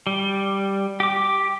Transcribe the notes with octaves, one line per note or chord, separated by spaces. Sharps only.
G3
G4 D6